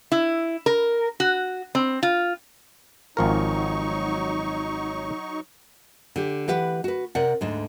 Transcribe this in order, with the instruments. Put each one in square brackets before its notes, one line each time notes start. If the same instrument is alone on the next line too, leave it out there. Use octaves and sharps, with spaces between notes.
[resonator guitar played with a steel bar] E4
A#4
F#4
C4
F4
[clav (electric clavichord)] G#1 F3 A#4 [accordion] F#3 D#4 C#6
[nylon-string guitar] D3 G4
E3 G4 B4 F#5
F#4 B4
C3 A#4 D5 F#5
D2 G#2 D3